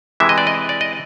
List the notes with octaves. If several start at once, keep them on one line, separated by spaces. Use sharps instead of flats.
C3 E3 G#3 E5
D#5
D5
D#5
D5
D#5